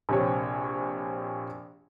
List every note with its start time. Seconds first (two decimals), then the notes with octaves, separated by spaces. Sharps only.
0.09 A#1 C3 C#5